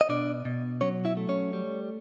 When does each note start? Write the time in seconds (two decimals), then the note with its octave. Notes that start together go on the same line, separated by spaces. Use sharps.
0.01 D#5
0.09 B2 D4 D5
0.45 B2
0.81 F#3 C#4 C#5
1.05 E4 E5
1.17 A3
1.29 C#4 C#5
1.53 G3